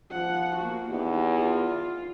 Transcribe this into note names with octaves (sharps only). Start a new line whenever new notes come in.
F3 F#5
A#3 F#4
E2 D#4 G4
F4